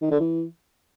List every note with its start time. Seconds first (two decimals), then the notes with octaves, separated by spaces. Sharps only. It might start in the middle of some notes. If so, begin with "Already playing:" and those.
0.02 D#3
0.11 D3
0.20 E3